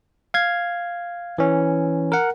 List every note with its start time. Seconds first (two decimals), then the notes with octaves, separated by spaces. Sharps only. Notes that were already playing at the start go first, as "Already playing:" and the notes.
0.34 F5 G#6
1.38 E3 C#4
2.12 A#4 F#5